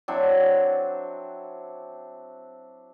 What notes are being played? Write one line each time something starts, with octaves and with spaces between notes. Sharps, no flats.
F#3 C4 D4 E4